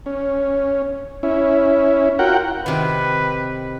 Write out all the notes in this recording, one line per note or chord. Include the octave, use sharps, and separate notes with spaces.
C#4
C#4 E4
F4 F#4 A#4 F#5 G5
C3 D#3 B4